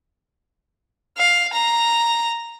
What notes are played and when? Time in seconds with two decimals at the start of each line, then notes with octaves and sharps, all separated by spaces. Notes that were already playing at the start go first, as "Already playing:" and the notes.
1.18 F5
1.54 A#5